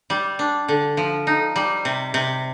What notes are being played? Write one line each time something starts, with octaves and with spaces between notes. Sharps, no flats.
G3
D4
D3
F3
D#4
G3
C3
C3